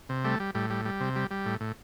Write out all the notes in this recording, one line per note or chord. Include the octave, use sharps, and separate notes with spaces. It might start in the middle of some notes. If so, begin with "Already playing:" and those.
C3
G3 A3
G3
A2 G3
G3
G3
C3
G3
G3
A2
A2